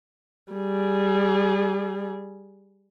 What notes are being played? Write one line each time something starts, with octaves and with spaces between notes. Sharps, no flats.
G3 G#4